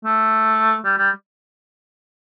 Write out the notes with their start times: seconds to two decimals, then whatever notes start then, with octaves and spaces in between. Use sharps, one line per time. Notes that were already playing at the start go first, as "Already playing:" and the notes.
0.05 A3
0.85 G3
0.98 G3